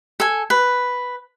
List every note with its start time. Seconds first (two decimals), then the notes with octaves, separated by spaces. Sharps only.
0.20 A4 G#5
0.50 B4